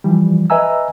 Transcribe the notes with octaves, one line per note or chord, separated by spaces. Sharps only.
E3 F3 G3
B4 D#5 E5 G#5 A#5 E6